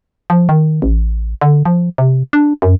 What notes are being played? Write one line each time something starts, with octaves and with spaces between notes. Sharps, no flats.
F3
D#3
A1
D3
F3
C3
D4
F#2